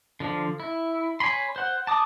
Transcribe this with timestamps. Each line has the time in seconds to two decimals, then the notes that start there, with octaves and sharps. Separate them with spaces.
0.20 D3 F3
0.60 E4
1.20 C#5 G#5 B5 C6
1.56 C5 F#5
1.87 A5 D6 D#6